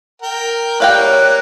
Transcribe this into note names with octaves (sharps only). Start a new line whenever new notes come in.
A#4 G5
G3 A#3 C#5 D5 F5 G5 F#6